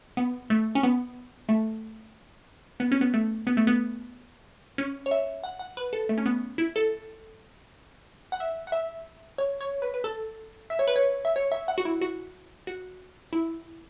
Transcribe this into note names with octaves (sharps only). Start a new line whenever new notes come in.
B3
A3
C#4
B3
A3
B3
C#4
B3
A3
B3
A3
B3
C#4
C#5
E5
F#5
F#5
B4
A4
A3
C#4
B3
E4
A4
F#5
E5
F#5
E5
C#5
C#5
B4
B4
A4
E5
C#5
B4
C#5
E5
C#5
E5
F#5
F#4
E4
F#4
F#4
E4